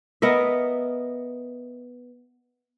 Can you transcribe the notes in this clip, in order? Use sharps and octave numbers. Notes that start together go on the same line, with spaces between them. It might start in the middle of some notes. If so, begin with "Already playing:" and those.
B3 A#4 D#5 E5